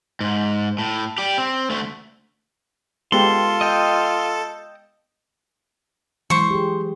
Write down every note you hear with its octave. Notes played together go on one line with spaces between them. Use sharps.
G#2
A2
G4 D5
C4
D2 A3
G#3 B3 F4 G4 A4 C6
D#5 G5
E3 F#3 G#3 C5 C#6
G4 G#4